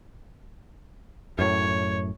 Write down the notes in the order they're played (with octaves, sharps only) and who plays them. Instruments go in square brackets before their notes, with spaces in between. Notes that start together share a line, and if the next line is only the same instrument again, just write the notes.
[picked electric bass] F#2 A2 [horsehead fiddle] C#5